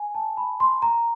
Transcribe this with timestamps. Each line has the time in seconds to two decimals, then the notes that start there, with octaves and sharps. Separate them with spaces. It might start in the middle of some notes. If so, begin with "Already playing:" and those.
Already playing: G#5
0.15 A5
0.37 B5
0.60 C6
0.82 A#5